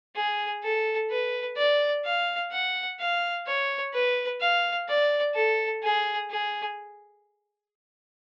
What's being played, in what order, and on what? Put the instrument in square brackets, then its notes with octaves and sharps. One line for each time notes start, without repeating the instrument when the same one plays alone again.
[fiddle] G#4
A4
B4
D5
F5
F#5
F5
C#5
B4
F5
D5
A4
G#4
G#4